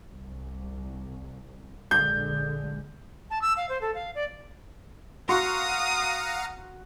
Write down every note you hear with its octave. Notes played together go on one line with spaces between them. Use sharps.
C2
A#1 D3 G#3 G6
A5
E6
F5
C5
A4
F5
D5
F#4 F5 F#5 A#5 C6 C#6 D#6